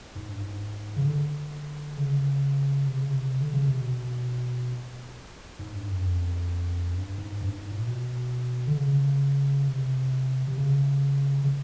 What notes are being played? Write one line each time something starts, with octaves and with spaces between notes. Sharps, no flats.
G#2
G2
G#2
C#3
D3
C#3
C3
C#3
C3
D3
C#3
C3
B2
G#2
G2
F#2
F2
G2
G#2
G2
G#2
A#2
B2
D3
C#3
C3
C3
C#3
C#3